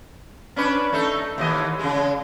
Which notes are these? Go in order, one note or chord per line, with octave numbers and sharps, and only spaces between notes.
C#4 D4 B4
A3 D#4 A4
D#2 E3 D#5
C#3 G#3